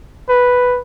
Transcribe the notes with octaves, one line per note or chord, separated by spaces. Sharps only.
B4